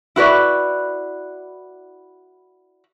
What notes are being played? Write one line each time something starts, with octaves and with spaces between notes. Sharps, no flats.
E4 F#4 B4 D5